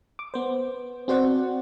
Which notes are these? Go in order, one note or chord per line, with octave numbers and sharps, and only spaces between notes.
D6
B3 C5
C4 F#4 C5 D5 F#5